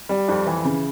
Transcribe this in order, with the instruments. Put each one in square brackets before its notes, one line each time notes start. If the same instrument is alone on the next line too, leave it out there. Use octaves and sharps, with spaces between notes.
[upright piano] G3
F2
E3
C#3